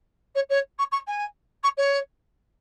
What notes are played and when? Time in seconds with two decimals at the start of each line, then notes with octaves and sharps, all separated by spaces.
0.35 C#5
0.49 C#5
0.78 C#6
0.91 C#6
1.07 G#5
1.63 C#6
1.77 C#5